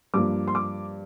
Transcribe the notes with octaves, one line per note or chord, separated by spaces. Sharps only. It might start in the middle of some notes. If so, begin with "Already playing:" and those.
G2 F3 A#3 D6
C6
D6